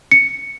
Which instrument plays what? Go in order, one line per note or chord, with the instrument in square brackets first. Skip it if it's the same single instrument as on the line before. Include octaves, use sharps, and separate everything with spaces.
[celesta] C#7